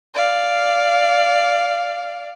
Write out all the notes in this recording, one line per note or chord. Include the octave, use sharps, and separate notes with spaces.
D5 F5